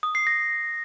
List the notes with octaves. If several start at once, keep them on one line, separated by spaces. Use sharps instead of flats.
D#6
C7
A#6